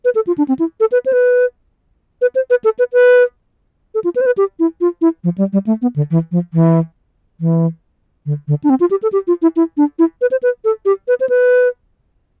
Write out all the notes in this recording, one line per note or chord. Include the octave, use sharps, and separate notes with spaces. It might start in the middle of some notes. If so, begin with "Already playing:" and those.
B4
A4
F4
D4
C4
E4
A4
B4
C5
B4
B4
C5
B4
A4
B4
B4
A4
F4
B4
C5
B4
G4
E4
F4
E4
F3
G3
G3
A3
B3
D3
E3
F3
E3
E3
D3
D3
D4
C4
F4
G4
A4
G4
F4
E4
E4
D4
E4
B4
C5
B4
A4
G4
B4
C5
B4